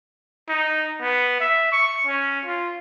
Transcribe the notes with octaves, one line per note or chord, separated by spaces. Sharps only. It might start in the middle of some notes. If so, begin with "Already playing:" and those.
D#4
B3
E5
C#6
C#4
F4